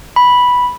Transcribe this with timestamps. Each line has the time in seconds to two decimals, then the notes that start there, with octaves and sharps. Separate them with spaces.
0.16 B5